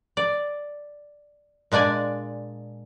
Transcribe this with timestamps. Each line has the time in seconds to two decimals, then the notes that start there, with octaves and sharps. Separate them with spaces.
0.17 D5
1.72 A#2 G#3 D4 D5 G#5